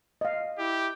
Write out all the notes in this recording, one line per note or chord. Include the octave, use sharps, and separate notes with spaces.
D#5 F5
E4 G4